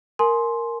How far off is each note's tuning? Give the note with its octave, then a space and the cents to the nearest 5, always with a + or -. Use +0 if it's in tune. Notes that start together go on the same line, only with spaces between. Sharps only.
A#4 -5 G#5 +30 C6 +0